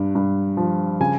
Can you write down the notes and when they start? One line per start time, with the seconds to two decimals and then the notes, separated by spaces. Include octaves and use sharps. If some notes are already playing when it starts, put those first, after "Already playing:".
Already playing: G2
0.15 G2
0.57 F3
1.00 C#3 G#5